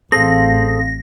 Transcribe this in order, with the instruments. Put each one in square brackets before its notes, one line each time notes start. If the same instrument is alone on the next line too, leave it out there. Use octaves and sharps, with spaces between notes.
[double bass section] A1 [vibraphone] C4 F5 [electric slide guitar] G#4 A4 C5 [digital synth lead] A#6